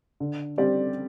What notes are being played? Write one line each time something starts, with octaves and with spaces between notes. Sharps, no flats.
D3
G3 C4 G4 D5